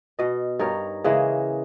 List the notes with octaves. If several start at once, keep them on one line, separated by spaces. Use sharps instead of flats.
B2 D#5
G2 D#4 A#4 C#5
C#3 E3 G#3 A#3